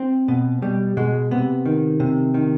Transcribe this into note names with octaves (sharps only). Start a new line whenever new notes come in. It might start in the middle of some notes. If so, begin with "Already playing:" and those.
Already playing: C4
B2
B2 G3
B2 G#3
C3 B3
D#3
C3
D#3